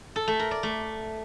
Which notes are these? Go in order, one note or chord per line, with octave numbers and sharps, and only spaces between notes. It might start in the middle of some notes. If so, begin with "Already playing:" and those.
A4
A3
A#4
D5
A3